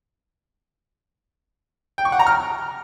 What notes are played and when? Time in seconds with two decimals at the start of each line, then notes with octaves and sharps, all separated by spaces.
1.98 G5
2.05 C#6
2.12 F#5
2.19 A#5
2.27 F6